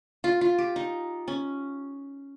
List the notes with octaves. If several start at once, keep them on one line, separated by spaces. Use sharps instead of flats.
F4
F4
G4
D#4
C#4